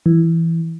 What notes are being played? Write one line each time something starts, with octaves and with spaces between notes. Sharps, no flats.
E3